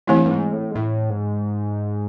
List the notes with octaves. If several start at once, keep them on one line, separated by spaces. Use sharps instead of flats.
G2 E3 A3 C4 E4
G2
G#2
A2
G#2
A2
G#2